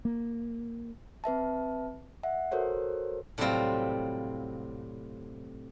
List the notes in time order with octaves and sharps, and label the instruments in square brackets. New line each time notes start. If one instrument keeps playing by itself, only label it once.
[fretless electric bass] A#3
[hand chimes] C4 B4 E5 A5
E5 F#5
F#4 A4 A#4 C5 C#5
[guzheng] A2 C3 F#3 G3 C4 F4